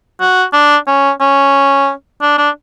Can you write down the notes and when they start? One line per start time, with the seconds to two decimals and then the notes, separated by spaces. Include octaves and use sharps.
0.20 F#4
0.53 D4
0.87 C#4
1.20 C#4
2.22 D4
2.38 D4